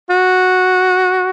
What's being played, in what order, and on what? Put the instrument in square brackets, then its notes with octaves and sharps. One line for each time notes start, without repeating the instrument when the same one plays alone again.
[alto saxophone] F#4